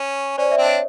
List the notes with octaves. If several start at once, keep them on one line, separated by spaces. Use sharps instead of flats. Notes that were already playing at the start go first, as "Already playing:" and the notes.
Already playing: C#4
C#4 C5 D5
D5 E5
C4 D4
C#5 D#5